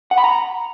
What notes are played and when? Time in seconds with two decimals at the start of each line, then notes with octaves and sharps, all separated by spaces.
0.11 F#5
0.18 B5
0.24 A#5